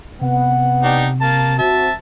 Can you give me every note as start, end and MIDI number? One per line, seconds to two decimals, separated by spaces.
0.21 1.61 48
0.21 1.14 59
0.21 1.14 78
0.83 1.07 62
0.83 1.07 63
0.83 1.07 67
1.21 1.55 58
1.21 1.55 81
1.59 1.89 60
1.59 1.89 66
1.59 1.93 76
1.59 1.93 81